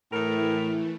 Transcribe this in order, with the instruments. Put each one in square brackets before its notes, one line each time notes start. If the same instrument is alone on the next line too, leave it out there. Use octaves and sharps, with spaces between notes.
[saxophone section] A2 A#4 [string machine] E3 A3